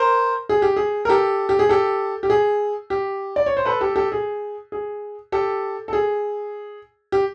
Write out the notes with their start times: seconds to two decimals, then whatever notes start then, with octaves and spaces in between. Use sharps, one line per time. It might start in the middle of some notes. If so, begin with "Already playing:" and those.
Already playing: A#4 C5
0.49 G#4
0.62 G4
0.77 G#4
1.05 A#4
1.09 G4 A4
1.49 G4
1.59 G#4
1.69 G4 A4
2.23 G4
2.30 G#4
2.90 G4
3.36 D5
3.46 C#5
3.57 C5
3.65 A4 B4
3.81 G4 A4
3.96 G4 A4
4.12 G#4
4.72 G#4
5.32 G4 A4
5.88 A4
5.93 G#4
7.12 G4